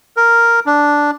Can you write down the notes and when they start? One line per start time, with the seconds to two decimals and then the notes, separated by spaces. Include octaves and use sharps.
0.17 A#4
0.66 D4